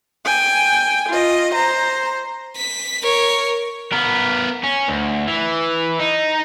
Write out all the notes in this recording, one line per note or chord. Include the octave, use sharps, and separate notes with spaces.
G5 G#5
F4 D#5
C5 A#5
B6
A#4 C#5
B3 A#4
C#4
D2
E3
D#4